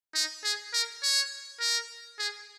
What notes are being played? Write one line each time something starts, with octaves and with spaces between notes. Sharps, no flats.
D#4
G#4
A#4
C#5
A#4
G#4